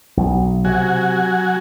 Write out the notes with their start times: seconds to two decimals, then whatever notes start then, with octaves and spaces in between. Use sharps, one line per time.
0.17 B1
0.65 C3 F#3 F#4 G#5